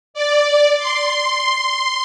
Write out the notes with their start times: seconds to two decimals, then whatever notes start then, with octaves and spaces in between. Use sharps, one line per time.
0.14 D5
0.78 C6